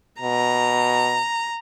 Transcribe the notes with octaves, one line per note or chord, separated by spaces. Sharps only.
B2 A#5